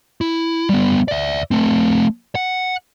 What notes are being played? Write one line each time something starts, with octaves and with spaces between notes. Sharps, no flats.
E4
G3 B3
D5 E5
A3 C4
F#5